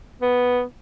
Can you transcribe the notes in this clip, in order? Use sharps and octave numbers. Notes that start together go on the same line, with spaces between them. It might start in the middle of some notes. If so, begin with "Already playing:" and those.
B3